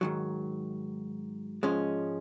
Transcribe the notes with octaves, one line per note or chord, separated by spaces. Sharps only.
G#2 D#3 F#3
G#2 F3 G#3 C#4